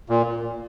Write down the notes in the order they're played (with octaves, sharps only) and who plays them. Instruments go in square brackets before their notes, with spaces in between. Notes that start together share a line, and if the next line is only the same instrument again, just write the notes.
[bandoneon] A#2